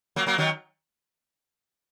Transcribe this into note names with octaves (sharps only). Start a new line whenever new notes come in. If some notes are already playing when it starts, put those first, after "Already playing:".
F#3 A#3
F#3 A#3
D#3 F#3